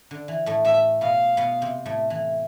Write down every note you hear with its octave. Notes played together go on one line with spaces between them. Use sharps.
D3
E3
A2 A3
A2 A3 E5
B2 B3 F5
B2 B3
C3 C4
A2 A3
E3